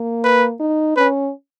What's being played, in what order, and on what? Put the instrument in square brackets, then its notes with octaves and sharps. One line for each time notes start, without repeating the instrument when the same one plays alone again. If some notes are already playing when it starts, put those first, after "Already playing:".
Already playing: [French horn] A#3
[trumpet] B4
[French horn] D#4
[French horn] C#4 [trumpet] B4